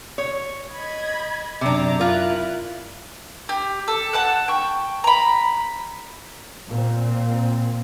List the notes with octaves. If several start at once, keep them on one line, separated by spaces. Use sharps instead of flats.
C#5
D#5 B5 G#6
F#2 C3 D4 A#5 D6
E4 F4 A#4 F#6
G4
A4
F#5 A5 F#6
G5 C#6
A#5 B5
A#2 C4